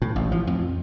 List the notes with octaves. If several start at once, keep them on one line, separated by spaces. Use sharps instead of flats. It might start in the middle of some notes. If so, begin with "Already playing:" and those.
A2
A1
F3
F2